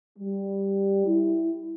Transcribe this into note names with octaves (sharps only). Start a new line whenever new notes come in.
G3
E4